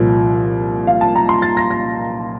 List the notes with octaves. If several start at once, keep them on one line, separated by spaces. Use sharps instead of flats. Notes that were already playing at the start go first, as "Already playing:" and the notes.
Already playing: C2 A#2 F3
F5
A5
A#5
C6
A6
A#6
A#6